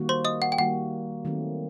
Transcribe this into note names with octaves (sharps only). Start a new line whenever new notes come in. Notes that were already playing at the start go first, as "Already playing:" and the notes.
Already playing: D#3 G3 A#3 F#4
C5 C6
D#5 D#6
F#5
G5
D#3 G3 A#3 F#4 F#5
D#3 F#3 A3 C4